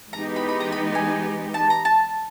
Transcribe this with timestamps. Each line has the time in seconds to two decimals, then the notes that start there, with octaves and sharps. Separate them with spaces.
0.13 E3 G#3 B3 D#4 G4 A#5
0.36 B5
0.49 B5
0.60 A#5
0.72 B5
0.95 G#5
1.54 A5
1.70 A#5
1.85 A5